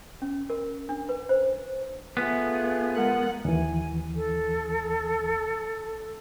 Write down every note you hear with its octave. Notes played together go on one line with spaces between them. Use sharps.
C#4
A#4
D4
B4
C5
A3 B3 F4 G#4
G#3 A#4 F#5
D#2 E3 G#5
A4